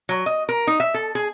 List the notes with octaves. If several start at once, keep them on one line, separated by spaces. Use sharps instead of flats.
F#3
D#5
A#4
D#4
E5
A4
G#4